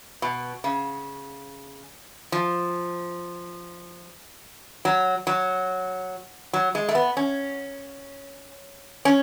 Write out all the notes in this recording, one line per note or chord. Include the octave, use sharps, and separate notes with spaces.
B2
C#3
F3
F#3
F#3
F#3
G#3
A3
B3
C#4
C#4